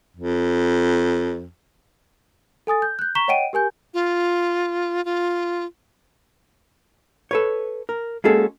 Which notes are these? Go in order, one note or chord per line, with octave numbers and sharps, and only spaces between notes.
F2
A4 G#5 D#6 A6
G6
F#6 G6
A#5 C#6 B6 E7 G7
C#5 D#5 F#5 G5 D7 D#7
G4 A#4 G#5 G6
F4
F4
A4 B4 C#5
A#4
G#3 A#3 C#4 F#4 G#4 A4